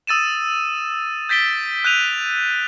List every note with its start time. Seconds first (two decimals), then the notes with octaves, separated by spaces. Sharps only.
0.07 D#6 E6 A6 D#7 E7
1.29 G6 A6 B6 D7 G7
1.85 F#6 G6 D#7 F7